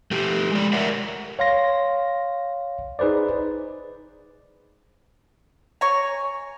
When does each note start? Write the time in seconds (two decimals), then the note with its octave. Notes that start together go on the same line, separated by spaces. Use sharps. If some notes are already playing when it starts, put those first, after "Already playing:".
0.11 A3 G4
0.51 G#3 D5
0.73 A#4 C#5 D5 E5 F#5
1.39 C#5 F5 C6 A#6
2.99 D#4 G#4 B4 C5 D5
5.81 C#5 G#5 A#5